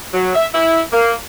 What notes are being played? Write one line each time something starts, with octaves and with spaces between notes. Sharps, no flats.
F#3
E5
E4
A#3